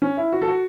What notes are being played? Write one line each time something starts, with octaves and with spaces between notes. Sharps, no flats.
C#4
E4
F#4
A4
F#4